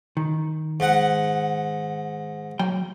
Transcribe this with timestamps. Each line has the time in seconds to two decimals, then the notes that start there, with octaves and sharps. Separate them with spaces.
0.17 D#3
0.80 G#2 F#5
2.59 F#3 G5